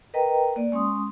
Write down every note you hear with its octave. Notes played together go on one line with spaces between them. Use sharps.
A#4 B4 D#5 G5 A#5
A#3 D5
G#3 C#4 C6 D#6